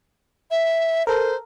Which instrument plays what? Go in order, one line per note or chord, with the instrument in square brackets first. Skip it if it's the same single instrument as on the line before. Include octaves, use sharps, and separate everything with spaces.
[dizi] E5
[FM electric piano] A4 A#4 [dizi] C5